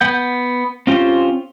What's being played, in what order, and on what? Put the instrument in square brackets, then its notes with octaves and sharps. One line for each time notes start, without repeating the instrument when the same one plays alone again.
[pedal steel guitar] B3 F#5 G6
C4 C#4 F4 G4 C5